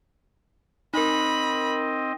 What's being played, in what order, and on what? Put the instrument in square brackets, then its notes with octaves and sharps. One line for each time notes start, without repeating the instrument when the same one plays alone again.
[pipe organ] C4 D#5 [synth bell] D#4 A#4 [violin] B5